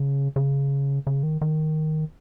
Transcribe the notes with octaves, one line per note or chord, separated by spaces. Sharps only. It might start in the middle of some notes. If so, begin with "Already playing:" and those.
Already playing: C#3
C#3
C#3
D#3
D#3